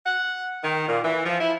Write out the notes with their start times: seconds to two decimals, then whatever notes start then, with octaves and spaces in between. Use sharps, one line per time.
0.06 F#5
0.63 D#3
0.88 A#2
1.04 E3
1.25 F3
1.41 E4